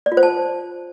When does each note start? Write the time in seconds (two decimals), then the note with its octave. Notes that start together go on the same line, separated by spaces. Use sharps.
0.06 D5
0.12 F4
0.17 C5
0.23 A5